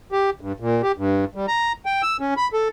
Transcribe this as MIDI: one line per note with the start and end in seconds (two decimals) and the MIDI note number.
0.12 0.30 67
0.41 0.52 43
0.60 0.82 46
0.83 0.92 67
0.98 1.25 43
1.35 1.46 55
1.48 1.72 82
1.86 2.02 79
2.03 2.17 88
2.20 2.34 61
2.37 2.48 83
2.53 2.68 69